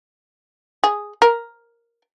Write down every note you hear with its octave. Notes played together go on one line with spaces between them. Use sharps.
G#4
A#4